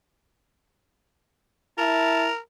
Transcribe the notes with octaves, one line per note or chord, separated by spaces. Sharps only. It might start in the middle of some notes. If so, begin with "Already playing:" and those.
E4 A#4 A5